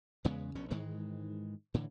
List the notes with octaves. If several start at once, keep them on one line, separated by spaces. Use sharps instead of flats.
E2 C#3 G#3 B3
A#1 B2 C#4
G#2 D#3 E3 G#3
A2 D3 E3